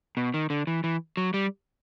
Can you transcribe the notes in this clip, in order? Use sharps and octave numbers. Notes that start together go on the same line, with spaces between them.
B2
D#3
D3
E3
E3
F#3
G3